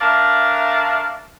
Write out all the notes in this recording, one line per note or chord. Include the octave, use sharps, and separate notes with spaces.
A3 D4 A#4 D5 E5 F5